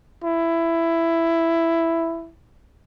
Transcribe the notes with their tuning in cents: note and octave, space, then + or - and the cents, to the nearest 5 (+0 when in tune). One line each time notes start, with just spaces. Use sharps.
E4 +10